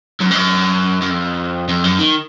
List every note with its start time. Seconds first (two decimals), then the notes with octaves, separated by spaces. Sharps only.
0.20 F#2
0.31 G#2
0.36 F#2
1.02 F#2
1.10 F2
1.69 F2
1.84 F#2
1.99 D#3